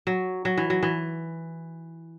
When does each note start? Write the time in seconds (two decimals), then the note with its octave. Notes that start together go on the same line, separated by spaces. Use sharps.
0.07 F#3
0.45 F#3
0.57 E3
0.70 F#3
0.83 E3